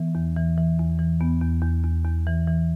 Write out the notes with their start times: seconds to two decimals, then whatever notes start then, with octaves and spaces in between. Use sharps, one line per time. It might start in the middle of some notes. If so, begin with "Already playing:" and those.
Already playing: E3 B3
0.15 E2
0.36 E3
0.58 E3
0.79 E2
0.99 E3
1.20 E2 B3
1.41 E2
1.62 E2
1.84 E2
2.05 E2
2.27 E3
2.48 E3